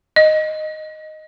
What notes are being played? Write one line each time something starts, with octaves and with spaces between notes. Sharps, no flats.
D#5